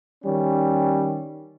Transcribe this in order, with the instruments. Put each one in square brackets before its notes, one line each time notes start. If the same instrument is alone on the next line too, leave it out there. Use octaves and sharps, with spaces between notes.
[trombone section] D#3 G3 C#4